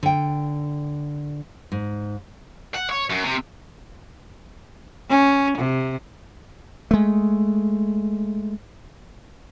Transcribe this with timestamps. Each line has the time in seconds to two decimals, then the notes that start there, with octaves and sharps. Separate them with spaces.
0.03 D3 G5
1.72 G#2
2.74 F#5
2.89 C#5
3.10 F#2
3.24 C3
5.09 C#4
5.58 C3
6.91 G#3 A3